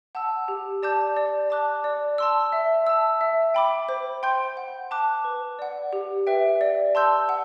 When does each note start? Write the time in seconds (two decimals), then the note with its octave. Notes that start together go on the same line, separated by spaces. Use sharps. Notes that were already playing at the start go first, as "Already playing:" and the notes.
0.15 F#5 A5 E6
0.48 G4
0.83 D5 A5 D6 G6
1.16 D5
1.50 A5 D6 F#6
1.84 D5
2.18 A5 C6 E6
2.52 E5
2.87 A5 E6
3.21 E5
3.54 G5 B5 D6
3.89 C5
4.23 G5 C6 G6
4.57 F#5
4.91 A5 D6 F#6
5.25 B4
5.59 D5 F#5
5.93 G4
6.27 B4 E5 G5
6.61 D5
6.95 A5 C6 E6 G6
7.29 F#5